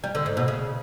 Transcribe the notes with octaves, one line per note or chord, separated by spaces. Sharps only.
G3
D3
G#2
B2
C#3